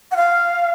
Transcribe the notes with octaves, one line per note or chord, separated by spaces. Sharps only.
F#5
F5